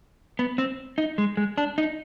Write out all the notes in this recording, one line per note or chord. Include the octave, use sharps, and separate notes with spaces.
B3
C4
D#4
G#3
G#3
D4
D#4